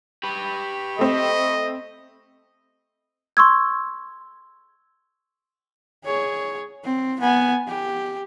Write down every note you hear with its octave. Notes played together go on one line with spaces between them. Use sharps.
G4 B4 B5 C#6
A3 C4 D#5
C6 C#6 E6 G#6
G#4 C#5
C4
B3 G#5
G4